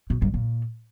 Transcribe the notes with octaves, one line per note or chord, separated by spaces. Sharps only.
B2
G2
A#2